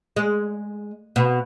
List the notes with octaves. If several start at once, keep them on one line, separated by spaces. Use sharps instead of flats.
G#3
B2